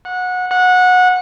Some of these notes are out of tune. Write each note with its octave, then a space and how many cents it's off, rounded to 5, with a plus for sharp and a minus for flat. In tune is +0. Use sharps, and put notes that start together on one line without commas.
F#5 -20
F#5 -20